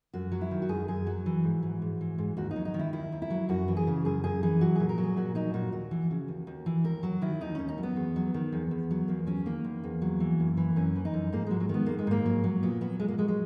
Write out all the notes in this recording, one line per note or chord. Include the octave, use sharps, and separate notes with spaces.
F#2 F#4
F#3
E4
D#3
F#4
F#2 G#4
F#2 G#4
F#3 F#4
E3
G#2
E3
G#2
E3
G#2
D#2 F#4
D#4
F#3
D#4
D#3
E4
D#2 E4
D#2
E4
F#3
F#2 F#4
E3
G#4
C#3
F#2 G#4
F#2 G#4
E3 G#4
F#3 F#4
A#2 G#4
A#4
F#3
G#4
A#2 F#4
F#3 D#4
A#2 F#4
D#2 F#4
E3
C#3
D#2
D#2
E3
D#2 A#4
F#3 F#4
D#3 E4
D#2 D#4
D#2 C#4
D#4
F#3
B3
E2
F#3
D#3
E2
E2
F#3
E2 A#3
F#3 C#4
D#3 A#3
E2
E2
F#3
E3
F#2
E3
F#2 C#4
E3
D#4
F#2
G#2 A#3
F#3 G#3
F#3
D#3 B3
G#2 A#3
G#3
G#2 A#3
F#3
F#3
A#2 B3
F#3 B3
A#2 G#3
A#3
F#3 G#3
G#3